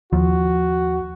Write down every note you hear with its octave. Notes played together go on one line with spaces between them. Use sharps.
D#2 F3 F#4